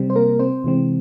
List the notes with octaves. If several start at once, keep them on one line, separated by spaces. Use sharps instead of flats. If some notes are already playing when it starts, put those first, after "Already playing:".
Already playing: C3 G3 C4
C5
A#3 A#4
C4 C5
C3 E3 G#3 C4